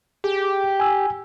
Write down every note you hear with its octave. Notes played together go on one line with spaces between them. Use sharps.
G4 G#4
G#5 E6